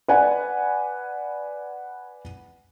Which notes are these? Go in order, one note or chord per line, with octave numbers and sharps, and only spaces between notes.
B4 D5 F#5 G#5